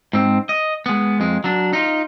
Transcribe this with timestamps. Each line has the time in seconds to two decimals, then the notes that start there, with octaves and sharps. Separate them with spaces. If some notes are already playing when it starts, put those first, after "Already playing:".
0.13 G#2 C4
0.49 D#5
0.86 G#3 B3
1.20 F2 G#3
1.44 F#3 D4
1.73 D#4 F4